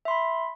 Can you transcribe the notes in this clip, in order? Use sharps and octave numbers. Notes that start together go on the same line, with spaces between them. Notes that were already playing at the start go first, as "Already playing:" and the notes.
E5 B5 C6